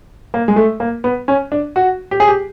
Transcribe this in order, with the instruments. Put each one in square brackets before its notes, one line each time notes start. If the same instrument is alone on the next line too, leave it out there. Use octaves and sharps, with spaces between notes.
[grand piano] A#3
G#3
A3
A#3
B3
C#4
D4
F#4
G4
G#4
G4